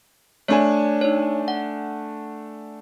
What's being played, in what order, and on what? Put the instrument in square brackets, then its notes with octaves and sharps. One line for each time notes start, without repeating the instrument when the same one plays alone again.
[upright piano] A3 D4 G#5 [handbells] C#5
[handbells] D#4 C#5
F#5